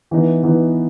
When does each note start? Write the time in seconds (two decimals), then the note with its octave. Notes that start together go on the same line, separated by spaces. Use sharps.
0.11 E3 B3 D#4
0.43 E3 B3 D#4